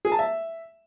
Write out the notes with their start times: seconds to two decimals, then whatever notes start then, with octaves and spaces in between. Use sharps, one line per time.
0.05 G#4
0.12 A5
0.19 E5